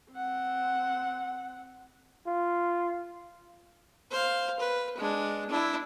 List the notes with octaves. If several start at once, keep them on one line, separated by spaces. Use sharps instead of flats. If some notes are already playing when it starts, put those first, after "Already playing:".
C4 F#5
F4
C5 F5
B4
G#3 D4
D4 E4